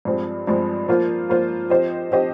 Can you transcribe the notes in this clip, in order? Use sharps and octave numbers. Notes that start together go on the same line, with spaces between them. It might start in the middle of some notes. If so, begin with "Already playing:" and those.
G2 F3 G#3 C4
G2 F3 G#3 C4
F3 A#3 F4 C5
F3 A#3 F4 C5
F3 C4 G4 C5 D#5
F3 C4 G4 C5 D#5